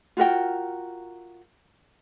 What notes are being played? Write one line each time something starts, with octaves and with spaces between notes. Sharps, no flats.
F4 F#4 A#4 G5